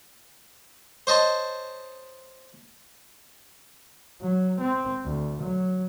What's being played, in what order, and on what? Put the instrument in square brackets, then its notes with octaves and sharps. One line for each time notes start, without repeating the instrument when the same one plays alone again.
[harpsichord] C5 C#5 D#5 A5 C6
[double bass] F#3
C4
D2
F#3